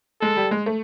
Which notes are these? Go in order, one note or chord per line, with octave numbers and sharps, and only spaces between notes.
G#3 A4
G3
G#3
A3